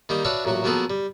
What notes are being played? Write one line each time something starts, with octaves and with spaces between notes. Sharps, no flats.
D#3 G3 A#3 D#4
D4 F#4 B4 C#5 E5 F5
A1 A#2 F#3 F#4
F3 F#3 A#3 B3 G#4 A4
G3